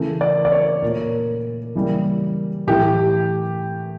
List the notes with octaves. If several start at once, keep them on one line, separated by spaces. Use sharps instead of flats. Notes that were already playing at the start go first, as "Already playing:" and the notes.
Already playing: C#3 E3 A3
D5
D5
C#5
A#2 A3 A#4
C#3 E3 G3 A#3
A2 E3 A3 G4